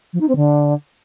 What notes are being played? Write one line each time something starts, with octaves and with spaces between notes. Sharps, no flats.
F3
D#4
C4
D3